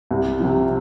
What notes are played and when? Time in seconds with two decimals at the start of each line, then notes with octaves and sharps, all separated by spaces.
0.11 C2
0.40 C3 F3